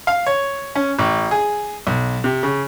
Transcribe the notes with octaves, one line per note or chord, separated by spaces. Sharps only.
F5
C#5
C#4
A1
G#4
B1
C3
C#3